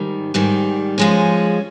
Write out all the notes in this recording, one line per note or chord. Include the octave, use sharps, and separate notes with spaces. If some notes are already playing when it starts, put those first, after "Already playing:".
Already playing: G#2 D#3 G3
G#2 D#3 G3
F3 G#3 C#4